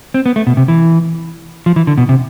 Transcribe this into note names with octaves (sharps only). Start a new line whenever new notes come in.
C4
B3
A3
B2
C3
E3
F3
E3
D3
B2
C3